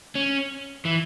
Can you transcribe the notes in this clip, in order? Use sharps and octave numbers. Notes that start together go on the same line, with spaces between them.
C#4
E3